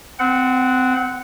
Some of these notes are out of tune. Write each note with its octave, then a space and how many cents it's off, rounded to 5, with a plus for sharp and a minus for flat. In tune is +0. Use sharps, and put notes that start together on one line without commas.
C4 -25 F#5 +0